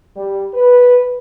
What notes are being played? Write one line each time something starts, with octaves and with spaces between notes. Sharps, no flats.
G3
B4